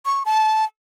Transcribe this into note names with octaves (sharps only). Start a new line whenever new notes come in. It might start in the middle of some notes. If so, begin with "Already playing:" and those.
C#6
A5